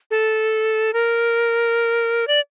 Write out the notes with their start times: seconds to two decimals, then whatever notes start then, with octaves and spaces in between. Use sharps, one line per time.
0.11 A4
0.93 A#4
2.27 D5